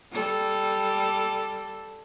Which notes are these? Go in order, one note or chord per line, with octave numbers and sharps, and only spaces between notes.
G3 A4